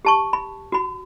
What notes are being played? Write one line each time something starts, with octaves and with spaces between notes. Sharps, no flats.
G4 A5 C#6
B5
F#4 B5